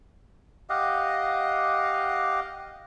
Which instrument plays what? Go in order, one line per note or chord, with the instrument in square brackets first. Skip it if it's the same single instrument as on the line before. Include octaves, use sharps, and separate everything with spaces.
[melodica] G4 D#5 F5 F#5